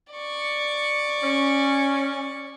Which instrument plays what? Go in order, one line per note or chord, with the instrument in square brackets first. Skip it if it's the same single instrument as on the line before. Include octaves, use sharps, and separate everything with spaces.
[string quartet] D5 C#6
[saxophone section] C#4